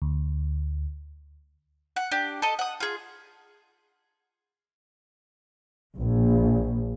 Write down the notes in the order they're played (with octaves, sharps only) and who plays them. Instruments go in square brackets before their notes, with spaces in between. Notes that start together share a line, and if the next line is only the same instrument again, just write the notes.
[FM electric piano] D2
[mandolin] F#5
D4 G4
A4 D#5
F#5 D#6
F4 G#4
[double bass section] A#1